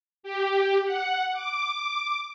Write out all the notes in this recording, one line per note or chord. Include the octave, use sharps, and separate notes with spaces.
G4
F#5
D6